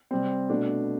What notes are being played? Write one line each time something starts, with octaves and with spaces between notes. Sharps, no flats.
C3 G3 C4
B2 A3 D4